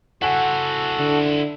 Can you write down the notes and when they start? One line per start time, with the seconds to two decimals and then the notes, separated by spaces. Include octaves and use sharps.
0.22 E4 F#4 A4 C5 F#5 G#5
1.00 D3